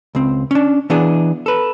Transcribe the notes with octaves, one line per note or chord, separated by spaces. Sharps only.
C#2 C4
C#4 D4
E3 B3 D4 G#4
A4 B4